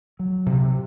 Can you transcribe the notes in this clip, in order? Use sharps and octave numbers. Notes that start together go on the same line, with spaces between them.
F#3
C3